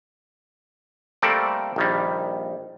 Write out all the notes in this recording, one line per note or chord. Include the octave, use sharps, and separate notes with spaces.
G3 A3 A#3 C4 A4 D5
A#1 D#3 G3